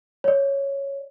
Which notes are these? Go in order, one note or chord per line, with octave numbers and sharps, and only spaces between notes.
C#5 D5